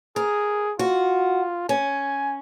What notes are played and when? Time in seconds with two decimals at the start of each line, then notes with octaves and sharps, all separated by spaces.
0.16 G#4 A#4
0.79 F4 F#4
1.69 C#4 G#5